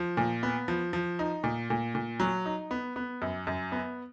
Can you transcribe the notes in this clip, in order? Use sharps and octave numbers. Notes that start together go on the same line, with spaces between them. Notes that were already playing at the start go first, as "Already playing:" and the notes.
Already playing: F3
A#2
B3
F3
F3
D#4
A#2
A#2
A#2
F#3
D#4
B3
B3
F#2
F#2
B3